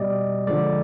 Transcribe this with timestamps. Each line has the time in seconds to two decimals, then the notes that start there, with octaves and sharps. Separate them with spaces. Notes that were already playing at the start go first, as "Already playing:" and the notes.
Already playing: B2 G3 G4 D5 D#5
0.47 D3 F3 G#3 D5